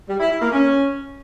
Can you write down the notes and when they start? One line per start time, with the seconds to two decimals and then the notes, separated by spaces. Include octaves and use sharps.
0.08 G3
0.19 E4
0.30 E4
0.41 A#3
0.52 C#4